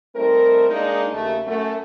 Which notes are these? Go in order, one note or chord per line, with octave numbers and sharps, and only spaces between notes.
G3 A3 C4 D#4 A#4
G#3 A#3 D4 D#4
D#2 C#3 A3
F#2 A3